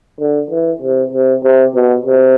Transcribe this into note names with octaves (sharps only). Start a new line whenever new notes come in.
D3
E3
C3
C3
C3
B2
C3